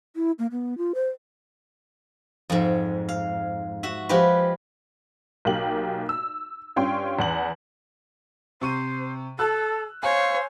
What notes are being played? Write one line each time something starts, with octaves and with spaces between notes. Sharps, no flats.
E4
A#3
B3
F4
C5
F2 G#2
F5
F#4 E5
F3 G#3 F4 G4 B4
B1 A#3 G4 F#7
E6
G2 C#4 F4 G5 C6
E2 F#5 F#7
C3 C5 C#6 D#7
A4 A5 E6 F#6
C5 C#5 F5 G#5